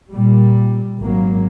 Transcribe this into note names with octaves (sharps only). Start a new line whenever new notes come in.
A#2 G3
G#1 F#3 A#3